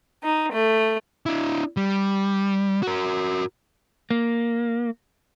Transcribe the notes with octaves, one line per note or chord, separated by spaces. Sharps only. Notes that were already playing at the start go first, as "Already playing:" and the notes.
D#4
A3
D4 E4
G3
F#4 A#4
A#3